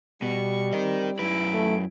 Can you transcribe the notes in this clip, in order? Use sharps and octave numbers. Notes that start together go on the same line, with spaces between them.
B2 G3 C#6
C4 A#4 D#5
F#2 E4 B4 D7
A3